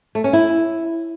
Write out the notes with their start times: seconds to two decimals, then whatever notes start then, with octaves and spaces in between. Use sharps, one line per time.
0.15 A3
0.24 C#4
0.33 E4